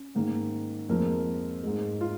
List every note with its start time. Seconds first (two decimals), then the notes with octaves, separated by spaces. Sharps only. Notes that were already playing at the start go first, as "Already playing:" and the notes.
Already playing: C#4
0.15 G#2 D#3 A#3
0.89 F2 F3 G#3 A#3 A#4
1.63 G#2 G#3
2.01 F4